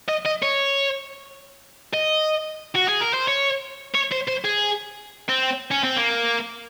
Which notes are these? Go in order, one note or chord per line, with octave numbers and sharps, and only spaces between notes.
D#5
D#5
C#5
D#5
F#4
G#4
A#4
C5
C#5
C#5
C5
C5
G#4
C4
C#4
C4
A#3